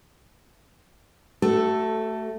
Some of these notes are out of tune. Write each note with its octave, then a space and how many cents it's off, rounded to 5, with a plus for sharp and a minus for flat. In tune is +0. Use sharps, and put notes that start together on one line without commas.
A3 +0 F#4 +35 A4 +10